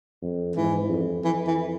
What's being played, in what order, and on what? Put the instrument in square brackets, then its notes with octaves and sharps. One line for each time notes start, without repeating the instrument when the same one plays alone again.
[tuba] F2
[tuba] G#2 [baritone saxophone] E3
[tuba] F2
[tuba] F2 [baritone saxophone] E3
[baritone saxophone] E3